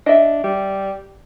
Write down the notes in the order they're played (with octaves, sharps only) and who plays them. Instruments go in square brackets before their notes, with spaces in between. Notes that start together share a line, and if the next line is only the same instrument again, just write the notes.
[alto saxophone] D4 [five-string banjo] D#5 E5
[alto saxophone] G3